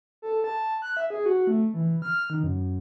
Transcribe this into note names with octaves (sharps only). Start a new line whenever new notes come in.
A4
A5
F#6
E5
G#4
F#4
A3
E3
F6
D#3
F#2